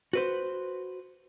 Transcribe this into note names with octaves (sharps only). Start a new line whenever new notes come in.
F#4 B4 C5